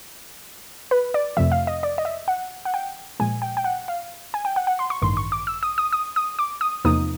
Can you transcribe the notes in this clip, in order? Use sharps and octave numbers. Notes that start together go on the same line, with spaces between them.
B4
D5
F2 C3 F3 A3 E5
F5
D#5
D5
D#5
E5
F#5
F#5
G5
A#2 F3 G#3 G#5
G5
G5
F#5
F5
G#5
G5
F#5
F#5
C6
C#6
A1 G2 D#3 C6
C#6
D6
E6
D#6
D#6
D#6
D#6
D6
D#6
E2 C3 F3 A#3 D#4 D#6